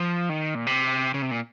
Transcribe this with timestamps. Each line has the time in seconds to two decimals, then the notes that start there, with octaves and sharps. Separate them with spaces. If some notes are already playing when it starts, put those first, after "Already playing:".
Already playing: F3
0.29 D#3
0.55 A#2
0.67 C3
1.14 C#3
1.22 C3
1.31 A#2